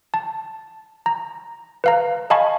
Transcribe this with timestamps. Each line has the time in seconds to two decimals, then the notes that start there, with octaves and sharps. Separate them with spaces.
0.14 A5
1.06 A#5
1.84 B4 F5 A#5
2.30 D#5 F5 G#5 A5 B5 C#6